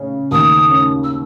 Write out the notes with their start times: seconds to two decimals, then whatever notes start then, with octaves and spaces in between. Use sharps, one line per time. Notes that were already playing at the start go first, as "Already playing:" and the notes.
Already playing: C#3 C#4
0.31 D#2 D#6
0.71 C#4
1.04 E6